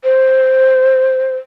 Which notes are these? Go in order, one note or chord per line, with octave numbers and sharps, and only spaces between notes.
C5